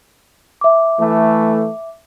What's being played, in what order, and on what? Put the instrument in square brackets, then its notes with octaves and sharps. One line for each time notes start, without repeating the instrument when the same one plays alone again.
[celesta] E5 D6
[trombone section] E3 A3